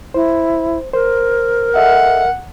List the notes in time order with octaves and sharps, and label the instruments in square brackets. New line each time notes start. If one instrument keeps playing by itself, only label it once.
[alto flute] E4 [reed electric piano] C5
[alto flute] A#4 [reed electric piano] C5
[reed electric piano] A4 D#5 E5 [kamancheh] F#5